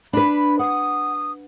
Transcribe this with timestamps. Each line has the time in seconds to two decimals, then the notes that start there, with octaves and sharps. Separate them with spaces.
0.13 D4 B4 B5
0.59 F#5 D#6